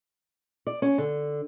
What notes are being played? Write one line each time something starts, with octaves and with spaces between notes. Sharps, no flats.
D5
C#4
D3